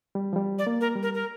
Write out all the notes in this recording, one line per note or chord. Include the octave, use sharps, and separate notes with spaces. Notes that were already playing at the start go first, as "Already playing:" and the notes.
G3
F3
G3
D5
A#3
A#4
G3
A#4
A#4